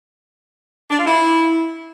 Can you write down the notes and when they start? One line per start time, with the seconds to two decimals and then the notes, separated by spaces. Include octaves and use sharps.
0.89 D4
0.97 F4
1.05 E4